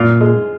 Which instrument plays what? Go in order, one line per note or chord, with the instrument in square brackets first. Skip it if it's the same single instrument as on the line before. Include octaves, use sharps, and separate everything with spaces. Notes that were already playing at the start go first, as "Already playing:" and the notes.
Already playing: [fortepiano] F#2 F4 [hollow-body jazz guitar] A#2
[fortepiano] G#3